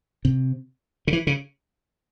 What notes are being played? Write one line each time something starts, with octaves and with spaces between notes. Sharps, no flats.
C3
C#3
E3
C#3